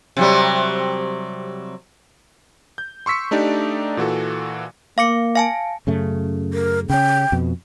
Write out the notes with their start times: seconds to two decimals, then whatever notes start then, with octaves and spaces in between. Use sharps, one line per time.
0.17 C3 F#3 G3
2.78 G6
3.06 C6 C#6 E6 B6 C#7
3.31 A3 D4 D#4 G4 D5
3.97 A#2 E3 F#4 A4
4.98 A#3 F5 D6 C#7
5.35 F5 G#5 A5
5.87 F#2 C#3 A3
6.53 A#4
6.90 C#3 C#4 G5
7.32 F2 B2